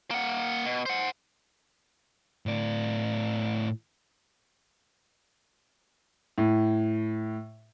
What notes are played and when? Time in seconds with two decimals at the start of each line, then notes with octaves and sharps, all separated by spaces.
0.11 A#3 F#5
0.66 B2
0.86 C5 F#5
2.46 A2 D5
6.38 A2